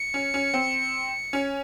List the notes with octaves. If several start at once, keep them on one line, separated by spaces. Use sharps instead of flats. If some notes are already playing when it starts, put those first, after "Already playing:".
Already playing: C#7
C#4
C#4
C4
C#4